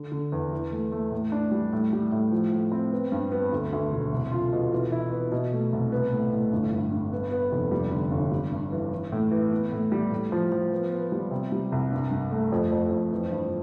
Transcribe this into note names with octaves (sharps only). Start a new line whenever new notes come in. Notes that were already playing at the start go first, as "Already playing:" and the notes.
Already playing: D3
D3
E2
E3
A3
A3
A2
D4
G3
A2
G3
A2
F3
A2
C4
B3
G2
B3
D2
D2
E1
C2
F4
B2
E3
E4
B3
B2
A3
C2
B3
A2
A2
G1
G2
G2
B3
B3
F1
G3
D3
G1
G3
G2
E3
E3
A2
E3
B3
A2
G3
A2
F3
F3
B3
B3
G3
C3
G3
C2
G2
G2
A3
F2
F2
F2
E3
G2